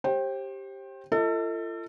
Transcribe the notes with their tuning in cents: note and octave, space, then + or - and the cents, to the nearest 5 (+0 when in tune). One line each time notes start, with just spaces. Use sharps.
G4 +0 C5 +35 G5 +0
F4 -35 A4 +30 D#5 +30